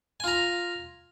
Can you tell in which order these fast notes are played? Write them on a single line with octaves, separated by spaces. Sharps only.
G#5 F4 A#5